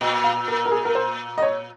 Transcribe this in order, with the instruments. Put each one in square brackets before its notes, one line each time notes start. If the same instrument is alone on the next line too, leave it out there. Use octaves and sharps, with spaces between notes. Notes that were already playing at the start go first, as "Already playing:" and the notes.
[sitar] A#2 [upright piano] D#5
[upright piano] F5
A#4
A#4
G#4
A#4
C5
D#5
C#5